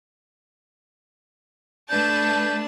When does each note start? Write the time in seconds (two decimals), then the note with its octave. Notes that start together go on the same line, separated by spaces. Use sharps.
1.90 A3 D4 B4 A5 G6